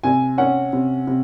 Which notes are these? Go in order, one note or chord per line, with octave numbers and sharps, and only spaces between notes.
C3 G#5
C#4 F#5
C3
C3